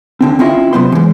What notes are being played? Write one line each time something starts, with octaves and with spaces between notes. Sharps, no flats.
D#2 D3 C4
C4 C#4 E4 F4 D#5
C3 E3 F#3 B3 C5 C6
E3 G#3